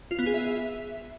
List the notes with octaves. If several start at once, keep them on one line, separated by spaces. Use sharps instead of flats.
F4
B3
G#4
E5